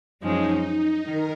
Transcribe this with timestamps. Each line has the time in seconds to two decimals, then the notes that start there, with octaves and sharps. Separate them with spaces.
0.21 F#2 F3 G#3 C#4 D#4
1.04 D#3 A#4